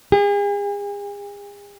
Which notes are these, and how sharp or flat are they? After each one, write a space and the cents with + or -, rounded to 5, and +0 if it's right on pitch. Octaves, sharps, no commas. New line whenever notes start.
G#4 -40